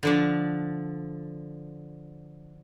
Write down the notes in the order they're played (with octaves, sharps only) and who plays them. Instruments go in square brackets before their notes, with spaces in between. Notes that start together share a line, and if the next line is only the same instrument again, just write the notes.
[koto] D3 F3 D4